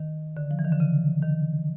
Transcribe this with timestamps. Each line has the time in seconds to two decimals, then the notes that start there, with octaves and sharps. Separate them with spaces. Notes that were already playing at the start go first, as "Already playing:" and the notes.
Already playing: D#3
0.37 D3
0.51 F3
0.59 E3
0.65 D#3
0.72 D3
0.80 C#3
1.22 D#3